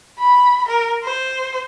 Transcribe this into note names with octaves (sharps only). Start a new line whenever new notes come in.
B5
A#4
C5